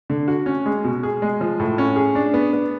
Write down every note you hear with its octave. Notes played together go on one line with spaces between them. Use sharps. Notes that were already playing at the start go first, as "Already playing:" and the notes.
D3
F#4
C#4
G#3
B2
G#4
G#3
F3
A2
C#4
G#4
D4
B3
B3